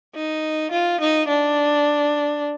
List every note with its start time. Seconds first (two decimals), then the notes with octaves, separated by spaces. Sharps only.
0.15 D#4
0.71 F4
1.00 D#4
1.28 D4